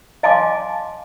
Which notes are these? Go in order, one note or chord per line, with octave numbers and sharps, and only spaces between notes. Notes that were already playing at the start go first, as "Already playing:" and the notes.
D#5 F5 G#5 A5 C6 D6